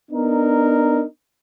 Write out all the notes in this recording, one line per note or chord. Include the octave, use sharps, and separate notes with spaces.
B3 D4 D#4 A#4